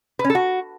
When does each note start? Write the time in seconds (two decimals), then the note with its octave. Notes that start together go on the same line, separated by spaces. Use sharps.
0.19 B4
0.24 C#4
0.30 A4
0.35 F#4